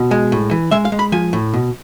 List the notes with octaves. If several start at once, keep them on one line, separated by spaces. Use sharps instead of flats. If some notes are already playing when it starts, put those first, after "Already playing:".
Already playing: B2
G#3
A2
E3
G#3 E5
F5
G#3
B5
F3 G#5
A2
B2